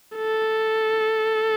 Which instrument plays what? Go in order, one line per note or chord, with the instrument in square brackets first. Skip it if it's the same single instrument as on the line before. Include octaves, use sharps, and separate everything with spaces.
[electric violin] A4